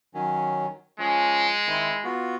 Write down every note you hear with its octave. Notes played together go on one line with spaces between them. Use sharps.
D#3 F#3 C#4
F3 G#3 C#4
D#3 C4 E4
B3 F4 F#4